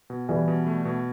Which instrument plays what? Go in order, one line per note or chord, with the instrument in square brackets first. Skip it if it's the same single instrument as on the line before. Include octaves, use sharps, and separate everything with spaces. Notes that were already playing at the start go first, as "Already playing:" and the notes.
[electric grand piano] B2
[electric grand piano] B2 [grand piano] E3 G3
[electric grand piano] B2
A3
B2